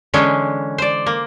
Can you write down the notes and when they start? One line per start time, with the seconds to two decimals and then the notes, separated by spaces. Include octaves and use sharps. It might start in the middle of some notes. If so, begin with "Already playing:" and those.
0.14 D3 E3 G#3 C#4
0.78 C5 D5
1.06 A#3